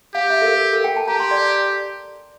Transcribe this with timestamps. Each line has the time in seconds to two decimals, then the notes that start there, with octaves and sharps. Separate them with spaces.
0.14 G4 F5
0.30 E5
0.42 A4
0.46 A#4
0.61 A#4
0.73 A4
0.84 G5
0.97 A5
1.08 G4 A#5
1.20 C6
1.31 D5